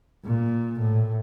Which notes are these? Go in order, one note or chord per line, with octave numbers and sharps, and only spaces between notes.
A#2
A2